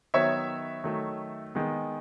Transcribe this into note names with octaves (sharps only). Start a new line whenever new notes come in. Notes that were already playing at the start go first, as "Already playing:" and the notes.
D#3 F#3 B3 C#5 E5
D#3 F#3 A3
D#3 G#3 B3